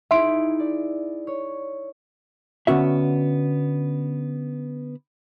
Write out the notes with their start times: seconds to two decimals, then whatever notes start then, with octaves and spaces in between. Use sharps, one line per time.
0.11 D#4 E4 G#4 E5 C6 D7
0.60 D5
1.27 C#5
2.67 D3 B3 C#4 F#4 E5